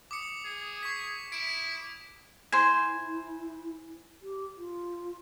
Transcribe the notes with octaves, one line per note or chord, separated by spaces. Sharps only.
D6 D#6 C#7
G#4
C#6 B6
E4 D7
E4 C5 G#5
G4
F4